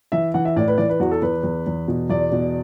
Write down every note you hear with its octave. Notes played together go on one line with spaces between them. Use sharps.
E3 E5
E3 F#5
E5
A2 D5
B4
E3 D5
B4
E2 F#4
A4
E2 B4
E2
E2
B2
E2 D5
B2